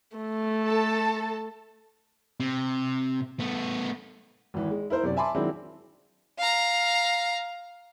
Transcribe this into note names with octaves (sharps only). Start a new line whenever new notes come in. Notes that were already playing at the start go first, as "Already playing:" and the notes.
A3
A4 A5
C3
A3 B3
G#1 E3
G#3
E4 A#4 C5
F#2 C3 D5
E5 G#5 A5 B5 C6 D6
D#3 F#3 G#3 C4 D4 E4
F5 A#5